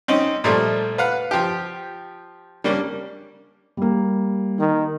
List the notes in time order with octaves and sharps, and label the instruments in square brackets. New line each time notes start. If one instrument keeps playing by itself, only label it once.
[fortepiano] C4 C#4 D#4
A#2 F3 G3 A3
B4 F5 F#5
F3 G4
G3 A#3 C#4 D4
[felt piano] G3 A#3
[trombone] D#3